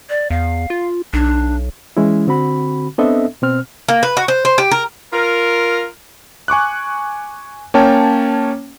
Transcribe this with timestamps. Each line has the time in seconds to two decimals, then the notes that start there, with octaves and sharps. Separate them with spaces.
0.10 D5
0.30 E2 F5
0.70 F4
1.13 B1 D4
1.97 E3 G#3 C#4 E4
2.27 D3 C4 F#4 B5
2.98 B3 C4 D4 A4 D#5 E5
3.42 B2 C4 F6
3.88 A#3
4.03 B4
4.17 F#4
4.28 C5
4.45 C5
4.58 G4
4.71 A#4
5.13 F4 A#4
6.48 G#5 C#6 D6 F#6
7.74 A#3 C#4 C#5 G5 A5